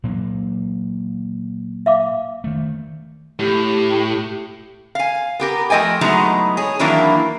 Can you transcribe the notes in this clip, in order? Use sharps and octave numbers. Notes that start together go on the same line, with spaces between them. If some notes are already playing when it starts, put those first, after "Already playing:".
A#2 F#3 A#3
E5 F5 D6
D#3 A3
A2 G4
F5 G#5
B3 G4 A#4
F3 A3 D#5 G5 G#5
F#3 G#3 A3 B3 D#4 E4
G#4 C#5
D#3 E3 F#3 A#3 D4 E4